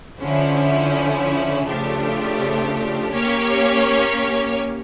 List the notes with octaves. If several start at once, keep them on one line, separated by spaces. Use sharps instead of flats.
D3 F3 C#4 E4
C#3 F3 A3 D4 G4
A#3 C#4 G4 C#5